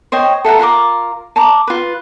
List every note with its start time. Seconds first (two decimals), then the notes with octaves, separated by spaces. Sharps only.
0.12 C5 C#5 D#5 G5
0.45 A4 E5 F#5 A#5
0.59 F4 A#4 A#5 D6
1.36 A5 A#5 D6
1.67 F4 B4